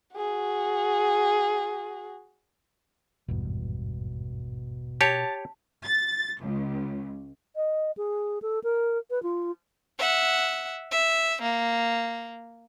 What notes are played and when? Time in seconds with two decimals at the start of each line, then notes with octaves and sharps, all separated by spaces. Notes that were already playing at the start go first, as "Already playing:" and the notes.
0.16 F#4 G#4
3.28 G#1 E2 G2 B2
5.01 G4 C#5 A5
5.84 A6
6.41 C#2
7.56 D#5
7.97 G#4
8.42 A4
8.64 A#4
9.11 B4
9.23 F4
9.99 E5 F#5
10.91 E5
11.42 A#3